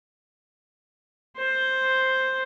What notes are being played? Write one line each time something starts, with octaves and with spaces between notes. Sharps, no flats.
C5